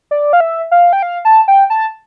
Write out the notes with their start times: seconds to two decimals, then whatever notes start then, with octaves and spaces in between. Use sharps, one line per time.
0.11 D5
0.33 F5
0.40 E5
0.71 F5
0.93 G5
1.02 F5
1.25 A5
1.48 G5
1.70 A5